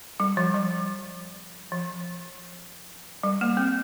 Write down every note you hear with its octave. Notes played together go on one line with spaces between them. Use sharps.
G3
F3
G3
F3
G3
A#3
C4